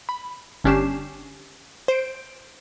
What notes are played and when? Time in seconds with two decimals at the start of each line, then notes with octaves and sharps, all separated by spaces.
0.09 B5
0.64 G1 C#4 D4 G4 C7 E7
1.88 C5 D7